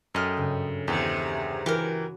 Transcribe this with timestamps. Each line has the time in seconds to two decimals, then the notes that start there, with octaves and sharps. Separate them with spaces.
0.15 F#2 G4 A4 D#5 F6
0.37 G2 C#3
0.88 E2 C3 D#3 G#3 G4
1.66 E3 F#4 G4 A#4